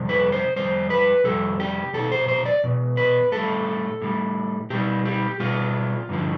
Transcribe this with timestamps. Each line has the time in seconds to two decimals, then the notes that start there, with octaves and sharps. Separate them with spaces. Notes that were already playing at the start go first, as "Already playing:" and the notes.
Already playing: F2 C3 G3
0.09 B4
0.32 C5
0.56 F2 C3 G3 C5
0.90 B4
1.24 F2 C3 G3 A4
1.60 G4
1.94 E2 B2 A4
2.12 C5
2.28 C5
2.46 D5
2.64 E2 B2
2.97 B4
3.32 A2 G3 A4
4.02 A2 G3
4.70 B2 G3 G4
5.05 G4
5.40 B2 G3 F4
6.09 G2 D3 F3